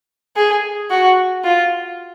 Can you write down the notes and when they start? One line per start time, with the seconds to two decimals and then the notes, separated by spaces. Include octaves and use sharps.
0.36 G#4
0.90 F#4
1.44 F4